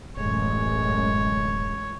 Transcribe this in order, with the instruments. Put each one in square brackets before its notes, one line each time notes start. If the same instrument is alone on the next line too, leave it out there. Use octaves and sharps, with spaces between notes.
[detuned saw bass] D1 [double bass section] A1 F#2 G#3 [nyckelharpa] C#5